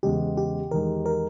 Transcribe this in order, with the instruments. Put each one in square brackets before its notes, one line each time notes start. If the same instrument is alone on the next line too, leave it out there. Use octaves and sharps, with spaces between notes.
[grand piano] E2 C#3 G#3 B3 [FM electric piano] G4
[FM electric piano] G4
[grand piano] E2 D#3 G#3 [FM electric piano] A#4
[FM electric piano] A#4